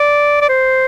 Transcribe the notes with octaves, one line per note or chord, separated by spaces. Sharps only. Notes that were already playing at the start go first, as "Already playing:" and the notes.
Already playing: D5
D5
C5